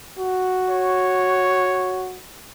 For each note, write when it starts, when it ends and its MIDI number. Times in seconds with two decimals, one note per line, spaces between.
0.18 2.18 66
0.70 2.10 73